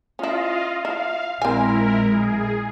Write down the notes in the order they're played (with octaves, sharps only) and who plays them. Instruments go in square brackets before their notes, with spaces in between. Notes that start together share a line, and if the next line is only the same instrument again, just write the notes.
[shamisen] C#4 E4 [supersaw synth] F4 D#5 F5
[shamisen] E4 [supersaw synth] F5
[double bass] A#1 G#3 [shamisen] C4 G#5 [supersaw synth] E4 A#4
[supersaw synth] G#4